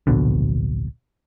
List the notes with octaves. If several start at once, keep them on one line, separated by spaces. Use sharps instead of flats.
D1 A#1 B2 D3